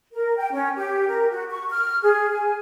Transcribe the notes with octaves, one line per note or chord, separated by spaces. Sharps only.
A#4
G5
C#4
G4
A#4
F#4
C#6
F6
G#4
G#5